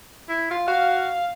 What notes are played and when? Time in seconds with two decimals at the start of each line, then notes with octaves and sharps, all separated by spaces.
0.29 E4
0.51 F4
0.68 F#4 F5